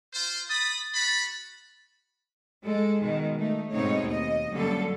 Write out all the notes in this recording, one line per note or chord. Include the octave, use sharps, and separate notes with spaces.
F4 C5
B5 D#6 A6
F#4 B5
G#3 A4
B2 D#3 G#3
A3 D#4
G#2 B2 A3 C4 D#4 C#5
D#2 D#5
F#2 D3 G3 A#3 C#4 A4